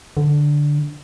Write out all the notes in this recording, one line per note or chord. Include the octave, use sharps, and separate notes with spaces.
D3